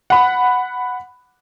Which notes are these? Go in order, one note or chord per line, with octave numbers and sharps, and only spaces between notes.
F#5 B5